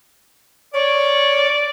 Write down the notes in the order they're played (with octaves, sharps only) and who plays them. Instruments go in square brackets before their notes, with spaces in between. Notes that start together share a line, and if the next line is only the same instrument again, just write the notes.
[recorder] C#5 [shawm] D5